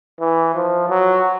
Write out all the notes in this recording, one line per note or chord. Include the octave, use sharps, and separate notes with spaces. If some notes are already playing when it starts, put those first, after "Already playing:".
E3
F3
F#3